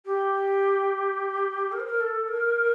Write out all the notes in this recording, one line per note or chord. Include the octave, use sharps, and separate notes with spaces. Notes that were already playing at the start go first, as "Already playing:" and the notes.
G4
A#4
C5
A#4
A4
A#4